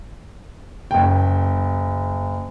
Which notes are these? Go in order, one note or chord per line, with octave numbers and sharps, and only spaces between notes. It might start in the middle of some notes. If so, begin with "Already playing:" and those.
F#1 G5